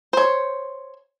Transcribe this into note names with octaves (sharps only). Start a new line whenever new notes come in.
C5 C#5